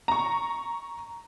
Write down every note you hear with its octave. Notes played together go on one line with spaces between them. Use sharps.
A#5 C#6